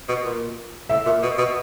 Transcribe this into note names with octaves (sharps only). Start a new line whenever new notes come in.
B2
A#2
A2 E5
A#2
B2
B2